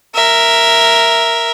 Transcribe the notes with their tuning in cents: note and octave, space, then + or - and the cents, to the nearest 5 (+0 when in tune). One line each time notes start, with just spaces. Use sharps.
A#4 +0 E5 +0